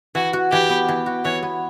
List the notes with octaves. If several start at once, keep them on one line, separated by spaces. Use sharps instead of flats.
E3 F#4
F#4
E3 G4
B3
E3
F#4
E3 C#5
B3